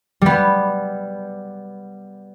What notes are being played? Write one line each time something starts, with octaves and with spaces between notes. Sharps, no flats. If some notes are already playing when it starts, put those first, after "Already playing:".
G3 B3